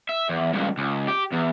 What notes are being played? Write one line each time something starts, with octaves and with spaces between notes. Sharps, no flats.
E5
E2
C#2 G2
C#2
G4
E2